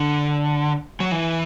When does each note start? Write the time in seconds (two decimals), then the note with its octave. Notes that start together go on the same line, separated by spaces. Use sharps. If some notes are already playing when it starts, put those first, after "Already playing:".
Already playing: D3
1.00 F#3
1.12 E3